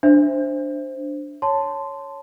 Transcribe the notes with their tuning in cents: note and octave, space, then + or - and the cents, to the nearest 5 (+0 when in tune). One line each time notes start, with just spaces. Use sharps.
D4 +0 C5 +0 E5 +0
C#5 +0 A5 +0 C6 -15